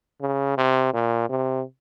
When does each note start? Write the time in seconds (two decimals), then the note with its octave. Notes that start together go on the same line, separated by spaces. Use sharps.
0.21 C#3
0.57 C3
0.93 A#2
1.29 C3